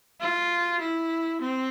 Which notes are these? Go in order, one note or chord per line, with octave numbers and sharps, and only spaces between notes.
F4
E4
C4